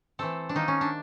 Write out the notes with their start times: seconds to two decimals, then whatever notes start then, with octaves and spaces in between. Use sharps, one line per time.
0.19 E3 A3 C4 A4
0.49 D4
0.55 D#3 G3 A#3 D#4
0.68 C#4
0.81 D4